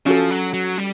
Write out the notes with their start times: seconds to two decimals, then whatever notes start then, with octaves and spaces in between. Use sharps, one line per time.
0.06 F3 C#4 F#4 A4
0.31 F#3
0.54 F#3
0.78 G3